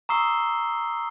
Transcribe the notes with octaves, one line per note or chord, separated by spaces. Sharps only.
A#5 C#6 D#6 E6 C7 G7